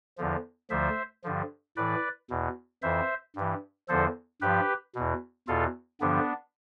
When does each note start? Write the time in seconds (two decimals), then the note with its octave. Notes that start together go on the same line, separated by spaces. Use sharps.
0.18 E2 D3 F3
0.70 D2 D3 F3 C5 E5
1.24 G2 D3 F3
1.77 A2 E3 B4 D5
2.30 E2 B2
2.82 F2 E3 C5 E5
3.36 G2 E3
3.89 E2 D3 F3 A4 C5
4.42 G2 F3 G4 B4
4.95 E2 B2
5.48 E2 B2 F4 A4
6.01 G2 D3 F3 B3 D4